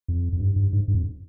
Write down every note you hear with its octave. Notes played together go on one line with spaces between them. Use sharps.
F2
F2
G2
G2
G#2
G2
F2